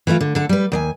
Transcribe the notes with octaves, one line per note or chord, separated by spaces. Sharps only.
E3 A3 E4 F4
D3
D3 A4
G3 B4
D#2 D5 G#5